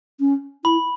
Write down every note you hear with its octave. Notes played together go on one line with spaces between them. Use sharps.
C#4
E4 B5